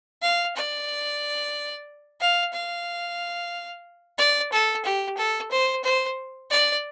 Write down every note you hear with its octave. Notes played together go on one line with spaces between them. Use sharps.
F5
D5
F5
F5
D5
A4
G4
A4
C5
C5
D5